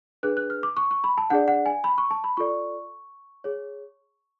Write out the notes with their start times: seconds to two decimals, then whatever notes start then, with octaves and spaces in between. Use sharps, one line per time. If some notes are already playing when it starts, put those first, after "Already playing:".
0.23 D4 G#4 B4 F#6
0.37 F#6
0.50 F6
0.63 D6
0.77 C#6
0.91 C#6
1.04 B5
1.18 A5
1.30 D4 G#4 D5 F#5
1.48 F#5
1.66 G#5
1.84 B5
1.98 C#6
2.11 A5
2.24 B5
2.37 F4 A4 D5 C#6
3.44 G#4 C#5